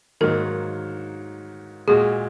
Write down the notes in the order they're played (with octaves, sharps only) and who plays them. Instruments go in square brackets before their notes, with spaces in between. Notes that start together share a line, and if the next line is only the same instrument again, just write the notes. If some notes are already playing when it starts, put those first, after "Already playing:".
[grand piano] G#2 D#3 F#3 A#3 [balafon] A#4
[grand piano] A#2 G#3 F#4 [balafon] G#4